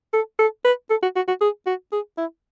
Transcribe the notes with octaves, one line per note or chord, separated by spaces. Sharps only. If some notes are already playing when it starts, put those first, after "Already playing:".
A4
A4
B4
A4
F#4
F#4
F#4
G#4
F#4
G#4
E4